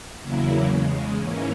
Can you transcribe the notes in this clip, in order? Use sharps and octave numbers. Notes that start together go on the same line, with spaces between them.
E2 C#3 F#3 A#3 E4
E2 C#3 G#3
G#2 E3 A#3 C#4